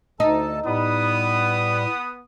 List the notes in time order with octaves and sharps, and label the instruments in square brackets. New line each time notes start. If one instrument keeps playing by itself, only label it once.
[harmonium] D2 A4 A5 [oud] D#4
[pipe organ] A2 [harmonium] G3 [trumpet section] B3 D#6